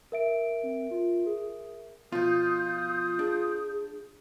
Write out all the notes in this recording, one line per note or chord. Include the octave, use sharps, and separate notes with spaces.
A#4 E5 D7
C4
F4
G#4
B2 F3 F4 D#6 G6
D4 G#4